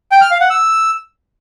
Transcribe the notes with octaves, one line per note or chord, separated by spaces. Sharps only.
G5
F6
F5
F#5
E6